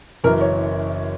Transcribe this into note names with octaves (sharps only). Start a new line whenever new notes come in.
F#1 F#2 E3 A#4
C#5